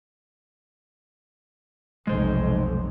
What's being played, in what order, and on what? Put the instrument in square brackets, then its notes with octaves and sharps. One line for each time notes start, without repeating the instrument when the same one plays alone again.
[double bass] F1 B1 [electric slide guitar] G#3 C5